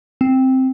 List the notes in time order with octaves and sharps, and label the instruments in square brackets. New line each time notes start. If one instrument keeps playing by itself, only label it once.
[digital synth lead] C4